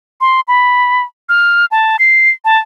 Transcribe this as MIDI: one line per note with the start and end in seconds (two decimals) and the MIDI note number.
0.21 0.41 84
0.48 1.03 83
1.29 1.66 89
1.71 1.97 81
1.99 2.30 96
2.45 2.58 81